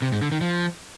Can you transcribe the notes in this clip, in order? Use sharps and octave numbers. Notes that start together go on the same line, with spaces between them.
C3
G#2
D3
D#3
F3